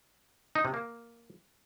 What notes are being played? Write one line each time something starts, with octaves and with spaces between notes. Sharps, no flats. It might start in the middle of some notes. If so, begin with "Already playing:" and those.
D#4
C3
A#3